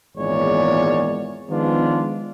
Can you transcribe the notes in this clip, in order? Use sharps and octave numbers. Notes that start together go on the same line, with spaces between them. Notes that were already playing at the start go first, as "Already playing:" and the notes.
G#1 E2 A#2 G#3 C#5 D5
D#3 F3 G#3 B3 D4 F4